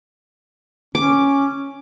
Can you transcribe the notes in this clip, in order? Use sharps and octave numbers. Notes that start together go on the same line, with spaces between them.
C#4 D6